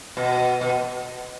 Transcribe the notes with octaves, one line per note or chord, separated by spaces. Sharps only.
B2
B2